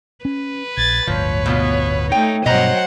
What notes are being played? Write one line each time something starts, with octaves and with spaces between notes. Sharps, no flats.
C#4 B4
A#1 G#6 A6
D1 G1 D2 F3 C#5
B2 B3 F4
A3 D#4 G5
G2 B2 F#3 C5 D#5 F#5 A#5